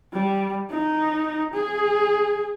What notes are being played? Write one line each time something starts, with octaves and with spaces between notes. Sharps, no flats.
G3
D#4
G#4